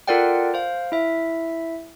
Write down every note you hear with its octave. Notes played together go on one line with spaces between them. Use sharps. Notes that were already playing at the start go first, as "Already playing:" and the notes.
F4 A4 A#4 D5 F#5 G5
C5 F5
E4 E5